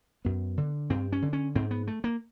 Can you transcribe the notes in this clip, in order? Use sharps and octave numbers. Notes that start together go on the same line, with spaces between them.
F#2 B3
D3
G2 C4
C#4
D3
C#4
G#2 C4
B3
A3
A#3